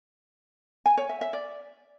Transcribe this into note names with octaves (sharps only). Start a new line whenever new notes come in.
G#5
C#5
E5
E5
D5